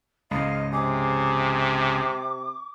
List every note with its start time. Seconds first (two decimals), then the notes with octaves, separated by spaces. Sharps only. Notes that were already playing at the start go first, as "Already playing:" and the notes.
0.31 C#2 G#2 D#5 F5
0.72 C3 G#4 D6